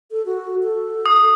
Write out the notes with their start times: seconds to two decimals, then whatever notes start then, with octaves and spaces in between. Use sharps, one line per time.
0.11 A4
0.26 F#4
0.63 A4
1.06 D#6